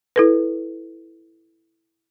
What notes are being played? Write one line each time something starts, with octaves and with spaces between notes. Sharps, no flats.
E4 A4 B4